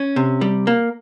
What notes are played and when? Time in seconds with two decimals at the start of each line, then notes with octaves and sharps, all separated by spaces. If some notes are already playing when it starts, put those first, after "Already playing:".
Already playing: C#4
0.16 C3
0.41 G3
0.67 A#3